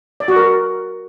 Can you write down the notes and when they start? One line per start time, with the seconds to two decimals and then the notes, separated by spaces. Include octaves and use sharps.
0.20 D5
0.28 F#4
0.36 A#4